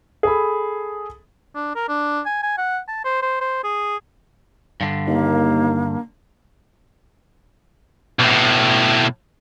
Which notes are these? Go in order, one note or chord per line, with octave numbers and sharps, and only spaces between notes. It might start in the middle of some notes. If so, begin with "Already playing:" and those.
G#4 A4 B5
D4
A#4
D4
G#5
G#5
F#5
A5
C5
C5
C5
G#4
G2 D3
D#2 A#3
B1 A2